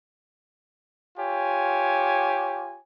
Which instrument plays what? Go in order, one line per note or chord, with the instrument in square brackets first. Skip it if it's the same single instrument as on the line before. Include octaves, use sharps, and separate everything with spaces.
[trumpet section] F4 G4 C#5 G#5